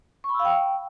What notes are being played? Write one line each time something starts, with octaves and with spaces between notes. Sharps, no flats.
C#6
B5
E6
F5
G5